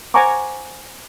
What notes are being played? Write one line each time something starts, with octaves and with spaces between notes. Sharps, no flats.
C5 F#5 G#5 A#5 C#6 D6